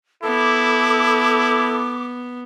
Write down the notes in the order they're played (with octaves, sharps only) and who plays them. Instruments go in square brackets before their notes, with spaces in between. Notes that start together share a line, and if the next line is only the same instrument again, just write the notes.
[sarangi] B3 [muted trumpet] E4 [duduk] A4 [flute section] D6